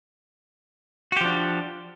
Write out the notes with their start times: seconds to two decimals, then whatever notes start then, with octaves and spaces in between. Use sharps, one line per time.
1.12 F#4
1.16 G4
1.21 F3
1.25 D4